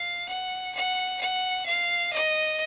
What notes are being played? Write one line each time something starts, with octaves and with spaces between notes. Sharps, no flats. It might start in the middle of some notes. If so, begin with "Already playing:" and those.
Already playing: F5
F#5
F#5
F#5
F5
D#5